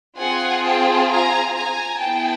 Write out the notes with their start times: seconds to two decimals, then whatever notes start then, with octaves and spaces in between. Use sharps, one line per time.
0.18 C4 F4 G#4 F#5 G#5
0.64 G5 A5
1.09 G#5 A#5
1.55 G#5 A#5
2.00 B3 E4 G#4 G5 A5